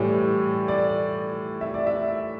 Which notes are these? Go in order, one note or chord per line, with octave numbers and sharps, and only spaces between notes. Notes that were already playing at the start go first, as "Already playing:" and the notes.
Already playing: A2 E3 G3 C#5
D5
E5
D5
E5